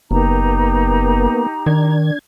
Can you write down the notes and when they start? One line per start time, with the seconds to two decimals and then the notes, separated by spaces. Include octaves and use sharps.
0.11 F#1 A#3 B3 D#4 G4 A#5
1.66 D#3 D4 G#6